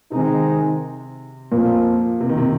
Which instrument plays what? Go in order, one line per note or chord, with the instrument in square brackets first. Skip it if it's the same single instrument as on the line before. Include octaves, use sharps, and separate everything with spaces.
[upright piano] C3 [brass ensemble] D#3 G#3 C4 D#4
[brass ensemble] F2 F3 A#3 F4 [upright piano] A#2
[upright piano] C3
D#3
C3